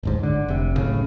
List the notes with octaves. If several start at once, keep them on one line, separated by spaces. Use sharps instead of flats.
D1 G1 G#2
D3
F1 C3
B1 A2 C#3